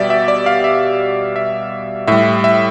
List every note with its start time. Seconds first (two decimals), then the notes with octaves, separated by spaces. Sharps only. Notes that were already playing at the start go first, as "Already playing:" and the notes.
Already playing: B2 G3 G4 D5 E5
0.10 E5
0.28 D5
0.46 F5
0.64 E5
1.36 E5
2.07 A2 G3 E5
2.44 E5